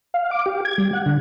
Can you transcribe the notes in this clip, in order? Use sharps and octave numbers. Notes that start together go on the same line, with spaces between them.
F5
D6
G4
G#6
G3
F#5
D3